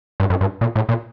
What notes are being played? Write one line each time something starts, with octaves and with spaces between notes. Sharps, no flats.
G2
F#2
G2
A#2
A2
A#2